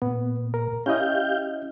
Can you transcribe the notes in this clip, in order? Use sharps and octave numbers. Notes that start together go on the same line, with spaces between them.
A#2 B3
A#4
C#4 E4 G4 D#5 F5 G6